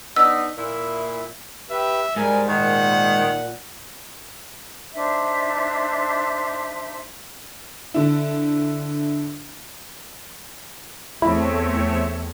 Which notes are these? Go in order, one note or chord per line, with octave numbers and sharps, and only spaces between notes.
B3 D4 D#4 E6
A#2 E4
G4 B4 E5
G#2 G3 A#4 G#5
A#2 D#3 F#5
D4 D#4 C5 E5
D3 E4
E2 A3 C4 E4 C#5 E5